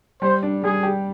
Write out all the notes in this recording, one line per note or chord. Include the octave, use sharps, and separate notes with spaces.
G3 C5
D4
G3 G#4
G4